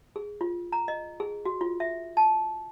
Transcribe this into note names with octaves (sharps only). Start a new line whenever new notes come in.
G#4
F4
A#5
D#5
G#4
F#4
F4
E5
A5